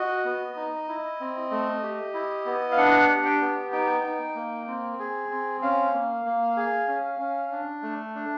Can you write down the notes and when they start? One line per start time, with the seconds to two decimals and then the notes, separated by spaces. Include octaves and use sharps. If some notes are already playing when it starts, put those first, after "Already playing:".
Already playing: F#4 D#5
0.25 B3
0.56 D#4
0.88 E4
1.20 C4
1.51 A3
1.83 G4
2.14 E4
2.46 B3
2.72 F5
2.78 D4 F#5
3.09 G4
3.25 G5
3.41 B3
3.72 D#4 G5
4.04 D#4
4.35 A#3
4.67 C4
4.99 G#4
5.31 C4
5.62 C#4 F5
5.93 A#3
6.25 A#3
6.57 G#4
6.88 C#4
7.19 C#4
7.52 D4
7.83 A3
8.15 D4